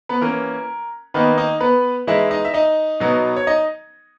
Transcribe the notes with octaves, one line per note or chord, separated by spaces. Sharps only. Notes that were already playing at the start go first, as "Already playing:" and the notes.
B3 B4
E3 A#3 C#4 A#4
D#3 A#3 B3 D#4 B4
D#4 D#5
B3 B4
E3 G#3 D#4 E4 E5
D#4 D#5
E5
D#4 D#5
B2 F#3 B3 D#4
C#5
D#4 D#5